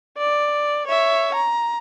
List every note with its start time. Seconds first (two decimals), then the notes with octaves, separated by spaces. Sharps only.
0.17 D5
0.87 C#5 E5
1.34 A#5